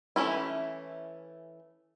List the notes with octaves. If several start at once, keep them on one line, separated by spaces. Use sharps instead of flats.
E3 A3 B3 C#4 E4